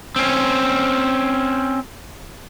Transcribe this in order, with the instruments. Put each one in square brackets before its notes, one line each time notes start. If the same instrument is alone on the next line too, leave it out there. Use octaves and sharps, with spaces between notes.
[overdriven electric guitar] C4 C#4